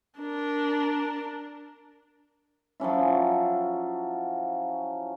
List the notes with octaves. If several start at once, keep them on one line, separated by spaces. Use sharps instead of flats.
D4 A#4
F3 F#3 C#4 E4